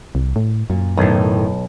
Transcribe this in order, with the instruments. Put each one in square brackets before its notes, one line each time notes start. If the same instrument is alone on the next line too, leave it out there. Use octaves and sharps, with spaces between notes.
[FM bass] C2
A2
[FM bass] F#2 [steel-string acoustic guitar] A#2
[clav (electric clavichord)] B1 [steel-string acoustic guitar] A2 D#3